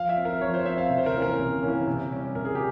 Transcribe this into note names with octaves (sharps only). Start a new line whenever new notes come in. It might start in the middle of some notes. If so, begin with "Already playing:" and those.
Already playing: F3 F5
E5
C4
A#4
F3 C#5
C5
C4 E5
F5
C3
C5
A#4
E3 A#3 C#4
A#4
C3
E3 A#3 C#4
C3
G3 C#4
C3 A#4
G#4
G4